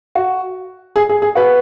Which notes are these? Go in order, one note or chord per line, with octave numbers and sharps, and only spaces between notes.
F#4
G#4
G#4
G#4
F#4 B4